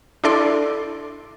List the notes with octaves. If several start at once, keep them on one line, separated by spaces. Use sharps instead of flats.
D4 E4 A4 D5 C6